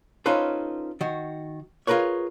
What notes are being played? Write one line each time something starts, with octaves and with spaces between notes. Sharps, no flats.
C#4 D#4 F4 A4 B4 C5
D#3 F#4
F4 G#4 A#4 B4 C#5